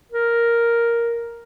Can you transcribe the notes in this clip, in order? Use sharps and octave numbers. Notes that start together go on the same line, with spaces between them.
A#4